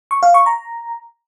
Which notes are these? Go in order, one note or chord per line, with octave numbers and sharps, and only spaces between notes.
C#6
F5
C#6
A#5